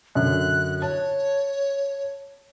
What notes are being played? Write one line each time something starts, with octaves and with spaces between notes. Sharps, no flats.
F#2 D3 F#6
C#5 A5